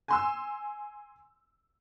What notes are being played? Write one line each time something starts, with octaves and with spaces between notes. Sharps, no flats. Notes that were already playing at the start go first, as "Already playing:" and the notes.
G#5 C6 E6